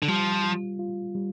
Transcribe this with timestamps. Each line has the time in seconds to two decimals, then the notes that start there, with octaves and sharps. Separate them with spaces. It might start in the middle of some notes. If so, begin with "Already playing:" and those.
0.03 D3
0.08 F3 G3
0.44 F4
0.79 F4
1.15 G3